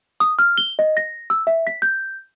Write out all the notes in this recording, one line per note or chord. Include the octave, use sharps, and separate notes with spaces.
D#6
F6
G7
D#5
A#6
E6
E5
B6
G6